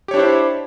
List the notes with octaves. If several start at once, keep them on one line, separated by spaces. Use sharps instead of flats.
D4 E4 G4 C5 C#5